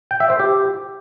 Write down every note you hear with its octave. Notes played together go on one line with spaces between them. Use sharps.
G5
E5
C5
G4